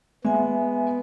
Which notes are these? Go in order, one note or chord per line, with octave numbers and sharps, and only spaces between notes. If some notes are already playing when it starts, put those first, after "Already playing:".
G#3 B3 E5 G#5